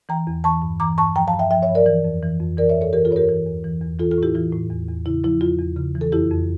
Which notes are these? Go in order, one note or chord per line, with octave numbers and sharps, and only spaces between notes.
E3 G5 A#5
E2
E3 A5 C#6
G2
E3 A#5 D6
G2 A5 C#6
F3 G5 A#5
F5 A5
G2
E5 G5
F3 E5 G5
C#5 E5
G2
A#4 D5
E3
F2
E3
F2
E3 A#4 D5
C#5 E5
G2
A4 C#5
E3 G4 A#4
F4 A4
G2 C#5
G4 A#4
E3
E2
E3
E2
E3 F4 A4
F4 A4
A2 E4 G4
E3 F4
A2
E2
E2
C#3 E4
F3 E4
E2 F4
E2
C#3
E3
A4
F2 E4 G4
F2